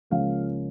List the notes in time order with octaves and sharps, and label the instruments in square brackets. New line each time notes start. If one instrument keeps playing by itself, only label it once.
[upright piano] C#2 C#3 F3 A#3 C#4 F5